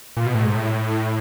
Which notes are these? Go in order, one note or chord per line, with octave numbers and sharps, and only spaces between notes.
A#2
B2
A2
G#2
A2